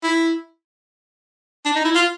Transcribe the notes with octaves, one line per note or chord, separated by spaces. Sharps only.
E4
D4
D#4
E4
F4